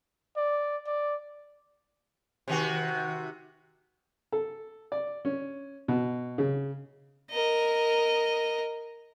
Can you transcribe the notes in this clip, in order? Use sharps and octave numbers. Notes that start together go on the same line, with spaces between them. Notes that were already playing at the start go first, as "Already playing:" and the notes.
D5
D5
C3 D#3 F#4
A4
D5
C#4
B2
C#3
A#4 D#5